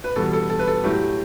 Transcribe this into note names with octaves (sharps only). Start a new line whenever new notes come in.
B4
E2 B2 G3 A4
A4
A4
B4
A4
A2 F#3 A3 G4